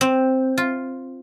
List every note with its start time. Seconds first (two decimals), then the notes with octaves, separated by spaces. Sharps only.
0.01 C4
0.58 F4